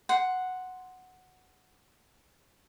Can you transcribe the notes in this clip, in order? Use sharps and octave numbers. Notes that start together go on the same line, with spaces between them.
F#5 C6